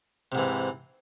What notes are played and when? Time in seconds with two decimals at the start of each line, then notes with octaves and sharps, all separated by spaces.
0.32 C3
0.35 G#2
0.38 E3